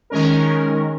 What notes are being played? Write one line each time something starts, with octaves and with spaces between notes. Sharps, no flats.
D#3 G#3 C#4 A#4